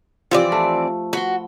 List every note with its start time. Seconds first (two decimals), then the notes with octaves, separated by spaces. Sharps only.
0.31 E3 F3 C4 F4 G4 D5
0.52 A3
1.13 F#4 B5 C6